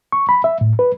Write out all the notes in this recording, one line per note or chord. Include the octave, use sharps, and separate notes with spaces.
C#6
B5
E5
A2
B4